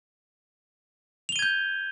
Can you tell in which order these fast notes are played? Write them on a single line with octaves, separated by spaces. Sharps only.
F7 G7 D#7 G#6 G6